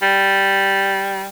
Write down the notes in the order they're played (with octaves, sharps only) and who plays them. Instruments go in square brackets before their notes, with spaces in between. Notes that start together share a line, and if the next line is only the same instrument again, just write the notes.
[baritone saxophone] G3